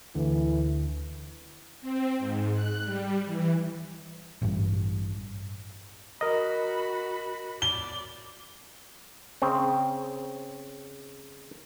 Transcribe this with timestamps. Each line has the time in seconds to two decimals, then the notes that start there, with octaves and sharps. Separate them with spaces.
0.15 D2 D3 E3
1.81 C4
2.19 G#2
2.53 F#6
2.84 G3
3.26 E3
4.42 A1 G2
6.21 F#4 A#4 D#5 B5
7.62 D5 G7
9.42 C#3 C4